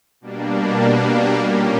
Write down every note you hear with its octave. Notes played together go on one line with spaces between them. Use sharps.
B2 G3 A#3 D4
A#2 G3 A#3 C#4 G4